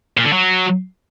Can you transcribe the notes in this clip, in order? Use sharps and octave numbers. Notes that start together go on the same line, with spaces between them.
A#2
D3
F#3